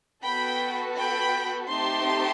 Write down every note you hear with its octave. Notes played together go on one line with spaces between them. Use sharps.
B3 F#4 A4 G5 B5
G5 B5
A3 C4 D#4 G4 A5 C6